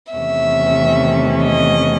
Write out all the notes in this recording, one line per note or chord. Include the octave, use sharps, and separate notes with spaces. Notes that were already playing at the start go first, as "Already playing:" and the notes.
E2 C3 D#3 A3 C#4 E5
D#5